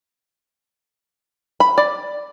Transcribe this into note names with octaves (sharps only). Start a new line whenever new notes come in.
B5
D5